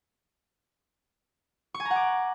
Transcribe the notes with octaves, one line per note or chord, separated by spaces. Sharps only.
C#6
G#5
A#5
F#5
D6